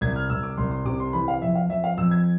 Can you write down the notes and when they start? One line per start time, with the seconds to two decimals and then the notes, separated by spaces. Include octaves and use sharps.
0.01 C2 G#6
0.16 F6
0.30 C2 E6
0.43 D6
0.58 C2 C6
0.71 C6
0.85 C3 D6
1.00 C6
1.13 E3 B5
1.28 F5
1.42 F2 E5
1.55 F5
1.69 F2 E5
1.84 F5
1.97 F2 E6
2.11 G#6